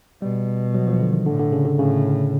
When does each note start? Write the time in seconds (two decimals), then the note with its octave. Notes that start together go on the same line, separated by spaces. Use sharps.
0.22 B2 G3
0.75 F#3
0.87 F3
1.00 D3
1.13 D#3
1.26 A2 D3
1.39 D3
1.52 C#3
1.65 D3
1.78 A2 C#3